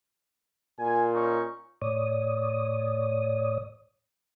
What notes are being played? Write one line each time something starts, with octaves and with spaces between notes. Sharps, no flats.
A#2 G#5
C#4 D#4 C#6
A2 C#5 D5 D#6